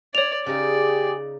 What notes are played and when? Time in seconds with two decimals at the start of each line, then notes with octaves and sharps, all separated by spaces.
0.15 C#5 D5 F7
0.46 C#3 D#4 G4 G#4 D5